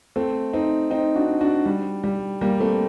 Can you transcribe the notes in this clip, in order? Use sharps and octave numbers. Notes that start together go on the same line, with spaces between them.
A3 C4
C4 D#4
C4 D#4
D4 F#4
D4 F#4
G3
G3
G3 A#3
A3 C4